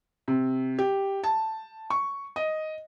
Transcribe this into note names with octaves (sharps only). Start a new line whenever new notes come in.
C3
G4
A5
C#6
D#5